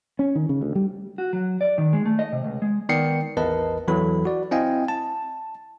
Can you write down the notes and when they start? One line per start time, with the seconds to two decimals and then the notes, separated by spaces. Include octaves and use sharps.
0.19 C#4
0.35 D#3
0.49 C#3
0.61 D2
0.75 G3
1.18 F#4
1.33 F#3
1.61 D5
1.78 D#3
1.93 G#3
2.06 A3
2.19 D#5
2.32 C3
2.44 C#2
2.62 G#3
2.89 D#3 B3 D5 G5 C7 C#7
3.37 A1 E2 A#4 B4 D#5 A5
3.88 E2 E3 F#3 A4 B5
4.25 F#4 D5
4.51 C4 E4 D#5 F5 G5 G#5
4.88 A5